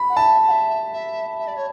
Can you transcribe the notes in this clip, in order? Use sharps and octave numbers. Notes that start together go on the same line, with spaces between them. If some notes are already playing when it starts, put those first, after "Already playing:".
Already playing: B5
F#5
E5 A5
F#5
E5
E5
E5
D5
C#5